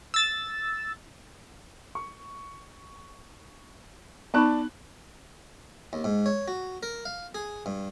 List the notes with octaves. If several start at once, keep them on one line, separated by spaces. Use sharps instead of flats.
E6 A6
C#6
B3 D#4 D5 A5 B5 F#6
D#2
G#2
C#5
F#4
A#4
F5
G#4
G2